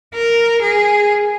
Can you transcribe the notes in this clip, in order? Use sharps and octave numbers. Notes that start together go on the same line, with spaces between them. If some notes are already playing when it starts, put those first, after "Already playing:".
A#4
G#4